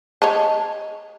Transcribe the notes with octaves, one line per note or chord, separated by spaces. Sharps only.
C#5 D#5 A5